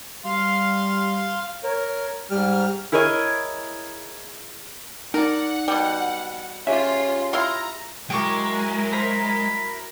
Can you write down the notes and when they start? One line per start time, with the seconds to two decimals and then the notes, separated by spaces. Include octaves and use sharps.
0.25 G3 F5 C6
1.64 A#4 C#5
2.31 G#2 G3 F6
2.92 E4 G#4 A#4 C#5 D#5
5.14 D#4 A#4 D5 F#5
5.68 B2 G3
6.67 C#4 F4 G4 G#4 E5
7.33 E4 F4 A#5 C6
8.10 F#3 G#3 E4 A#4 G5 C#6 D6
8.92 C5 A#5 B5